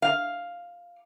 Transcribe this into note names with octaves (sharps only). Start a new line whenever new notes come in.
F5